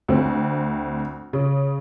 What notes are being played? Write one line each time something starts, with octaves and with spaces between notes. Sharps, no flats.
D2 C4
C#3